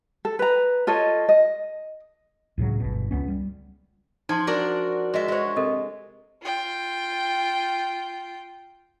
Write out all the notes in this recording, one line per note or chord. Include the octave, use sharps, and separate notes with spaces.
A4
B4 A#5
F4 A4 C#5 D#5
D#5
C#2 A2 C#3 F#3
G1 B2
C#2 B3 C#4
G3
F3 D#4 A5 C6 G#6
D4 F#4 A#4 D5
G#3 G#4 D#5 E5
G#3 F4 C5 C#5
C3 A4 A#4 D#5
F4 G5